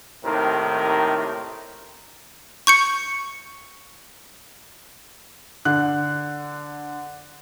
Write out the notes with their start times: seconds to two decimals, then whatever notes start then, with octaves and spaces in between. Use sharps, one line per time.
0.24 D#2 A2 C3 D#3 A#4
2.67 C#6 G6 C#7
5.65 D3 F#6